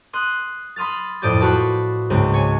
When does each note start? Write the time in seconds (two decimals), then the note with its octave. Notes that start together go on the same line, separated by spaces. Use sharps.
0.13 C6 D#6 F#6
0.76 B5 C6 D#6 F6 A6
1.22 F2 A2 D5 D#6 G6
1.40 F4 F#4 B4 A5 B5
2.10 C#2 G#2 C4
2.34 C#5 G#5